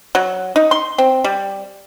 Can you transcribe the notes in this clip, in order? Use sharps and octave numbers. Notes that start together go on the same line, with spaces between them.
F#3
D#4
C6
C4
G3